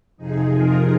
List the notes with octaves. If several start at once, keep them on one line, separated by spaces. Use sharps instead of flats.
F2 C3 F3 D#4 G#4
F4 A#4